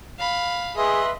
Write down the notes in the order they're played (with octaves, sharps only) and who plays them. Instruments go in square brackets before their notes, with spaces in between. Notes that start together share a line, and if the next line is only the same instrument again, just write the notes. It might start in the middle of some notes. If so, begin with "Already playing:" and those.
[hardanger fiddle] F5 B5
[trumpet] G#4 [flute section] B4 E5 C6 [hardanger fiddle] D#5